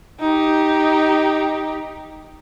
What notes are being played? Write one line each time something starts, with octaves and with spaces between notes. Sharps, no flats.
D#4 G4